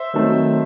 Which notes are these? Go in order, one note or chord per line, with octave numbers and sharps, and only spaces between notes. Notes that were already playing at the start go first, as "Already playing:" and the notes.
Already playing: C5 E5
D#3 F#3 A3 C4